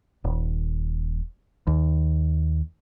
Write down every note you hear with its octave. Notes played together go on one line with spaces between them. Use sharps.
D#1
D#2